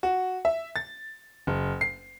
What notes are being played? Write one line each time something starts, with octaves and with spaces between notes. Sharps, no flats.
F#4
E5
A6
F#1
C7